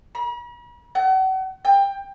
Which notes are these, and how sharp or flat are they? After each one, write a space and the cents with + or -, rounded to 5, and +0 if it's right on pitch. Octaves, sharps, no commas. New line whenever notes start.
B5 -45
F#5 +40
G5 +20